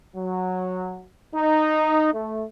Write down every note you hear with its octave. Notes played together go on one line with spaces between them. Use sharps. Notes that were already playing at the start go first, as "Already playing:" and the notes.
F#3
D#4
A3